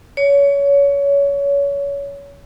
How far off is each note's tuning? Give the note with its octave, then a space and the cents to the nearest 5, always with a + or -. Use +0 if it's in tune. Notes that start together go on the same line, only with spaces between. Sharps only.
C#5 +25